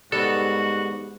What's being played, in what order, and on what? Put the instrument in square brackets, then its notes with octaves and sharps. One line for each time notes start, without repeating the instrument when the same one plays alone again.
[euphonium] G#2 [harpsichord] G3 B3 [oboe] F#4 [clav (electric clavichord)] A4